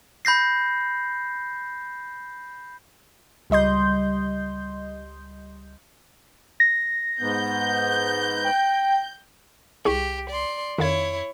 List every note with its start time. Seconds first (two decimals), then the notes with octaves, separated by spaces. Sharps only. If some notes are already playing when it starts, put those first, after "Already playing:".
0.25 B5 G6 A#6 C7
3.50 C#2 G3 D#5 C6 G6
6.60 A#6
7.21 G#2 B3 G6
8.44 G5
9.85 C2 G4 G#4 C#6
10.30 D5 C6
10.78 F2 D#3 E4 C#5 F5 G#6